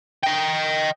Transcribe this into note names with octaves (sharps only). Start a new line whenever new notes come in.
D#5 G5